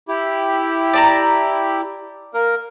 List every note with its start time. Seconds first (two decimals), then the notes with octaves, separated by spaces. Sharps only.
0.08 E4 G4
0.93 D5 A5 A#5
2.34 A#3 A#4